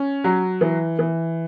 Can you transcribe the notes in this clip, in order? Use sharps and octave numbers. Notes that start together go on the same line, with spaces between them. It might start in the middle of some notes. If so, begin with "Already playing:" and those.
Already playing: C#4
F#3
E3
E3